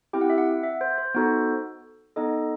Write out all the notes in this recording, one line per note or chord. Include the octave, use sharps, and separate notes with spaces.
C4 E4 G4 G5
F#5
E5
F#5
E5
C5
C5
B3 D#4 F#4 A4 C5
B3 D#4 A4 D#5